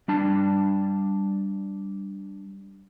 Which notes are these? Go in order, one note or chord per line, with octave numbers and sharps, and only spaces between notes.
G3 D4 A5